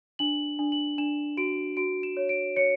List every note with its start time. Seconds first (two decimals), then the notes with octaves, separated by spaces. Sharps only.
0.19 D4 F#7
0.59 D4
0.72 F#7
0.98 D4 E7
1.37 F#4 D7
1.77 F#4 D7
2.03 E7
2.17 C#5
2.29 D7
2.56 C#5 C#7